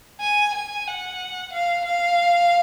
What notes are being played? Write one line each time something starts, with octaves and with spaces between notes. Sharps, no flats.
G#5
G#5
F#5
F5
F5